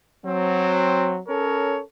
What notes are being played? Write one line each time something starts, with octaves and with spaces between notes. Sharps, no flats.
F#3 C4
C#4 A4 A#4 C#5